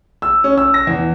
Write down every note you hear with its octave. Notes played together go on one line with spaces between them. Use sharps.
E6
C#4
E6
A#6
E2